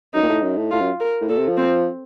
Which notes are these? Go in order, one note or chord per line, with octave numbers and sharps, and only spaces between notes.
F#2 D#4
A#2
A2
F#2
A2
A2 F4
F#2
A#4
A2
A#2 A4
C3
F3
C4